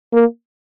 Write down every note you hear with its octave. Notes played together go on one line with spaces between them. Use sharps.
A#3